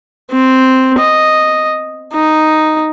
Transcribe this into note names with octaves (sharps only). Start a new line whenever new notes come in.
C4
D#5
D#4